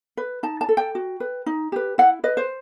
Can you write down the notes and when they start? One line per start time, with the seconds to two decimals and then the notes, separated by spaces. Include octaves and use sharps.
0.17 B4
0.43 D#4 A5
0.61 A5
0.69 A4
0.77 G5
0.95 F#4
1.20 B4
1.46 D#4
1.72 G4 B4
1.98 E4 F#5
2.24 B4 D#5
2.37 C5